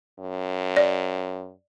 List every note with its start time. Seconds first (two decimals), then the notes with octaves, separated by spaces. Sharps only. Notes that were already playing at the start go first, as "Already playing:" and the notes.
0.19 F#2
0.77 D5